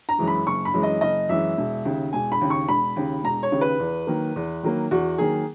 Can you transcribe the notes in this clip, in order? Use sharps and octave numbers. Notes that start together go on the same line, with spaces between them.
A#5
F#2 E3 G#3
B5
F#1 C#6
B5
F#2 E3 G#3
D#5
F#1 D#5
F#2 E3 G#3 E5
E1
D#2 C#3
E1 G#5
B5
D#2 C#3
C#6
E1 B5
D#2 C#3
E1 A#5
C#5
D#2 C#3
B4
E2
D#3 F#3 A#3
E2
D#3 F#3 A#3
E2 F#4
D#3 F#3 A#3 G#4